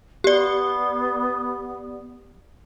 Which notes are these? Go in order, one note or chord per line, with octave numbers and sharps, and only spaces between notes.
B3 G4 D5